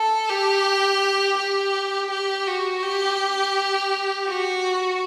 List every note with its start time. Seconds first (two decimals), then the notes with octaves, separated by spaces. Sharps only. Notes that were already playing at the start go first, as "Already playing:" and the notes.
Already playing: A4
0.29 G4
1.38 G4
2.10 G4
2.47 F#4
2.82 G4
4.27 F#4